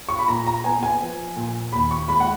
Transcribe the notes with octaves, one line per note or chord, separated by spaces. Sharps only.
C#6
B5
A#2 A#5
A#5
B3 G#5
G#5
F3
A#2
D#2 B5
C#6
G#3 B5
F#5